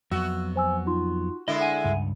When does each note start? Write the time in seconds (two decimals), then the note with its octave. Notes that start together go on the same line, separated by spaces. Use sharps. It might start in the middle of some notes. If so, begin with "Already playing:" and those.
0.11 F2 F#3 B3 F#4 E6
0.56 C5 G#5 E6
0.86 D#4 F4 C6
1.48 D3 G#3 E4 A4 A#4 D#5
1.61 E5 F#5 G#5 D#7
1.84 C#2 G2